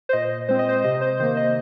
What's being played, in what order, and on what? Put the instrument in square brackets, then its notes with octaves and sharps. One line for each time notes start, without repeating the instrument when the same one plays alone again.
[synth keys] C5
A#2 D#5
G#3 C4 C5
D#5
C5
C3 D#5
C5
D#3 A#3 C5
D#5